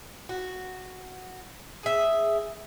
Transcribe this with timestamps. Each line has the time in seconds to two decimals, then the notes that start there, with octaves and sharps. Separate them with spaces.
0.29 F#4
1.83 G#4 E5